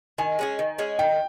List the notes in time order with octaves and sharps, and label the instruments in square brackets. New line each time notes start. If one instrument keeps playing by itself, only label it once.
[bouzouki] D#3 [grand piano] G#5
[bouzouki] G#3 C#4 G#4
D#3
G#3 C#4 G#4
[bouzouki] D#3 [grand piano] G5